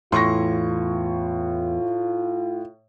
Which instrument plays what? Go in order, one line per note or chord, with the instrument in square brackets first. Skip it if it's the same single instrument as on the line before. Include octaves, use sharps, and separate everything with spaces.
[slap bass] E2 E3 [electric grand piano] A2 [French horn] F4 [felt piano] C6 C#6 A#6